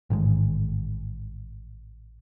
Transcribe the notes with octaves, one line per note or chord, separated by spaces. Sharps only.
A1 G#2 D#3 G#3